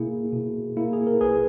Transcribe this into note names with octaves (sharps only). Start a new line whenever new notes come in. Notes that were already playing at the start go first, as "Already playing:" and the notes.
Already playing: B2 A#3 E4 G#4
B2
A#3 E4
G#4
A#4
A#1 G#4 B4